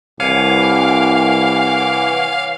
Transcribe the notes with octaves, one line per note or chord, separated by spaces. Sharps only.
C2 E3 C#5 F5 F#5 G#5 D6